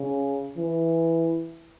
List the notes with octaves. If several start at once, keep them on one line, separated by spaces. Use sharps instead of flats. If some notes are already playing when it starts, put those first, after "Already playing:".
Already playing: C#3
E3